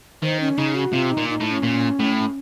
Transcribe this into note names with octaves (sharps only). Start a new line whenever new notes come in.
D#3 C5
C#4
C#3 D#4
F#4
C3 F4
D#4
A#2
D#4
A2
D#4
C#4
A#2
A2